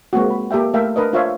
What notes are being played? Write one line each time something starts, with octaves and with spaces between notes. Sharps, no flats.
G#3 A#3 C4 F#4
G#3 B5
A#3 G4 A4 E5 G5
A3 A4 A#4 E5 F5 G5
D4 A#4 B4 D#5
D4 F4 C5 C#5 E5 F5